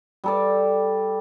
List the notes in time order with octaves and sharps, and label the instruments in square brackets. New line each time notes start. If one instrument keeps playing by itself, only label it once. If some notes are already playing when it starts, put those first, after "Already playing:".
[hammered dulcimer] G3 A4 D5